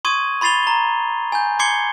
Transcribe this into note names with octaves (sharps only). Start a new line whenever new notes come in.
C6 C#6 D#6 G#6 D#7
B5 C6 A6 C7 F7 G7
A#5 G7
G#5 G6
C6 D6 G#6 C7 C#7 G7